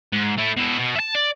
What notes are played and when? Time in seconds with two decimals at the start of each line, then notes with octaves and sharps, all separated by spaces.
0.12 G#2
0.38 A3 E4
0.57 B2 E4
0.79 B2
0.96 E5 A5
1.15 D5